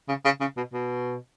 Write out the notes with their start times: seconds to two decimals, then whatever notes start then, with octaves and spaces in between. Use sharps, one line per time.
0.08 C#3
0.24 C#3
0.40 C#3
0.57 B2
0.73 B2